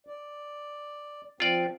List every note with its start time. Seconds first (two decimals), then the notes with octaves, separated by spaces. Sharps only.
0.07 D5
1.40 F3 C4 F4 D5